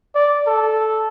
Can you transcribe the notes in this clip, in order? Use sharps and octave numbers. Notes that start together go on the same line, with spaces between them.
D5
A4